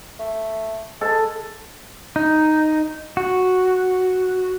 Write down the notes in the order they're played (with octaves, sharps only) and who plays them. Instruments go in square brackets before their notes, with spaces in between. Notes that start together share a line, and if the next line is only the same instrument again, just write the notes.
[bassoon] A3
[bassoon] G#3 [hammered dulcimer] A4
[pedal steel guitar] D#4
F#4